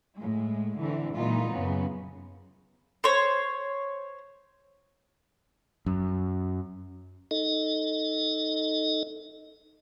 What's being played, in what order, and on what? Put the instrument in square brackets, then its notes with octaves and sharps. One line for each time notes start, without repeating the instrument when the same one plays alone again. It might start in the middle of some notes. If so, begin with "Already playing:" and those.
[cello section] A2 G#3
D3 E3 C4
A#2 E3 F#3 G#3 D#4 F4
F#2 C#3 B3
[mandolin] C5 C#5
[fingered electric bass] F#2
[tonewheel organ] D#4 A4 D#5